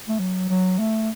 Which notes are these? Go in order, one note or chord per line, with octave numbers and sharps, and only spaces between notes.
A3
F#3
F#3
A3